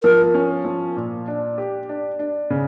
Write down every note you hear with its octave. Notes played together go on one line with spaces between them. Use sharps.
F3 A#4
C#4
F3
A#2
D4
G4
D4
D4
C#3